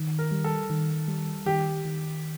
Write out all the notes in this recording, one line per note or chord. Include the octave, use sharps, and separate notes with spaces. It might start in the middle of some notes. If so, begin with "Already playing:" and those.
Already playing: D#3
A#4
G3
A4
D#3
G3
D#3 G4
D#3